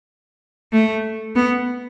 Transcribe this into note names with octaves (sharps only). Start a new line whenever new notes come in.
A3
B3